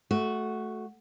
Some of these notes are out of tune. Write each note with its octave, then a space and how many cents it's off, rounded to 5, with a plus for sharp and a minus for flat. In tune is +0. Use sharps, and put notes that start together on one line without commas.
A3 -15 F#4 +0